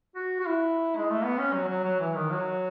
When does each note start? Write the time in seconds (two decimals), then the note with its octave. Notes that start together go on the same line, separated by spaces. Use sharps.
0.15 F#4
0.40 F#4
0.46 E4
0.97 G#3
1.10 A3
1.25 B3
1.39 C#4
1.54 F#3
1.68 F#3
1.84 F#3
2.00 E3
2.15 D#3
2.30 F#3